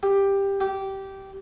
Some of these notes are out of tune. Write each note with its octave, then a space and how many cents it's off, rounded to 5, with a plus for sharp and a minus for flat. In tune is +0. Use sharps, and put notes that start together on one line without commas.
G4 +10
G4 -15